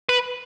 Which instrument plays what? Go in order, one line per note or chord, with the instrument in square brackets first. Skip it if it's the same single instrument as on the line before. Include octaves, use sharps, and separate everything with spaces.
[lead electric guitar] B4